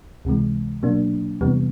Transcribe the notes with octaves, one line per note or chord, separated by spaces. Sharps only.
C#2 C3 E3 G#3
B2 F#3 A#3 D4
E2 C3 E3 G3 B3